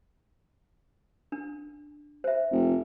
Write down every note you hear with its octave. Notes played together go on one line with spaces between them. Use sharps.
D4
C5 E5
F1